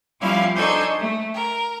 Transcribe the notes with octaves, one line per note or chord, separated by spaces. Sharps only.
F3 G3 B3 C#4 E4 F5
D4 D#4 A4 C5 G#5 C#6
A3
A#4